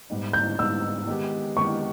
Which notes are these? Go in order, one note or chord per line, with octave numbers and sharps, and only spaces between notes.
G#2 G3 B3 D#4
G6
G#2 G3 B3 D#4 E6
D#3 G#3 B3 G4
D#3 G#3 B3 G4 C#6